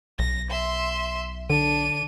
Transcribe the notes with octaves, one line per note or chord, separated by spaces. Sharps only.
B1 A#6
E5 C6
D3 D4 D#7